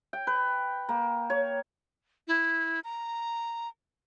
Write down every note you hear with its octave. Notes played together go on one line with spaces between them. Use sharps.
G5
B4
A#3
C#5
E4
A#5